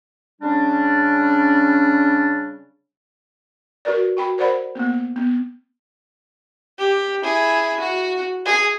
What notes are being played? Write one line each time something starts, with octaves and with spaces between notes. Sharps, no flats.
C#3 G3 C#4 D4
F#4 A#4 B4 D5
F#4 G5 B5
A#4 C5 D5 F#5 B5
A#3 B3
B3
G4
E4 G#4
F#4
G#4